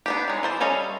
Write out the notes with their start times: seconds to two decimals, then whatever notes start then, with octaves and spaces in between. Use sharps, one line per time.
0.06 B3 D4 G4
0.28 F#3 G#3
0.43 E3 C5 A5
0.60 G3 C#4 A4 D#5 F5